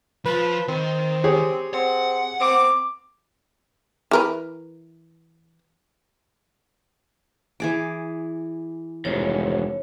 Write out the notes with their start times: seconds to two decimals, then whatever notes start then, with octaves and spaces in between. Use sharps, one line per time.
0.25 F3 F4 B4
0.68 D#3 C4
1.24 G4 G#4 C#5
1.74 C4 F#5
2.40 C4 D6
4.11 E3 A#4 B4
7.60 E3 G#4 D6
9.05 F1 E2 G#2 C#5